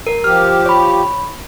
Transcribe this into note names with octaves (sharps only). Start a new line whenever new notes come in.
A#4
F3 G4 F6
C#5 B5